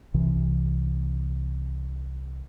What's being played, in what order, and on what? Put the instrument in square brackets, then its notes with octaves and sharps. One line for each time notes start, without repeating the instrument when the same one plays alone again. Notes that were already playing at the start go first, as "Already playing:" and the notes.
[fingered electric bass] C2 C3 E3